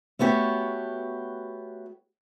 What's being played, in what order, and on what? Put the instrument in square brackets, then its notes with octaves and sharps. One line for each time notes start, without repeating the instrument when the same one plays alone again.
[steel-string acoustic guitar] A3 B3 F#4 G4 C#5